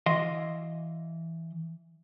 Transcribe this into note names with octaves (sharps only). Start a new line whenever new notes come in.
E3 D#5 F5 C6